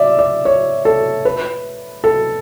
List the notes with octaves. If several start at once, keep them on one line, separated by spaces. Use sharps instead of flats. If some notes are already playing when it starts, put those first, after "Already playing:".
Already playing: D5 E5
D5
C#5
A4
B4
A4